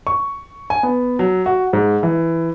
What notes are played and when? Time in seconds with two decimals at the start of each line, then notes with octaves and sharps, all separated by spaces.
0.07 C#6
0.70 G#5
0.83 B3
1.19 F#3
1.46 F#4
1.73 G#2
2.03 E3